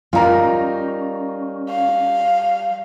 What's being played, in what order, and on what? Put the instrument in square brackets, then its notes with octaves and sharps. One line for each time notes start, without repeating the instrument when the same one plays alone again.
[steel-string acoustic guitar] G3 D#4 A#4 [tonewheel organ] C#4 [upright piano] F4 A#5
[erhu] F5